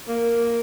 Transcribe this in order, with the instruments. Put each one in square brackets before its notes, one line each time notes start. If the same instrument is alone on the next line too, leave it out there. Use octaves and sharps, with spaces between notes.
[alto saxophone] A#3